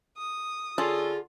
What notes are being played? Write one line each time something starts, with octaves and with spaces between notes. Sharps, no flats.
D#6
D3 C#4 F4 G#4 A4